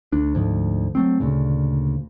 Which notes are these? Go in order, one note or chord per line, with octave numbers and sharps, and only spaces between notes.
D2 D4
D2 G#2 F3
F#3 A3 C4
D2 A#2 C#3